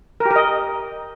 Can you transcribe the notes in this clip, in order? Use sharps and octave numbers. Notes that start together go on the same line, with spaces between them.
A#4
G4
A#4
D#5